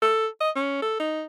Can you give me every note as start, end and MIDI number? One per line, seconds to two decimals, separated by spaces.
0.02 0.27 69
0.40 0.50 75
0.55 0.79 61
0.82 0.97 69
1.00 1.24 63